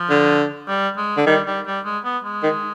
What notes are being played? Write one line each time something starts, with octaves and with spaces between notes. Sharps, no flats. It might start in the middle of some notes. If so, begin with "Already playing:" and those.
Already playing: F3
D3
G3
G#3
D3
D#3 G3
G3
G3
G#3
B3
G#3
D#3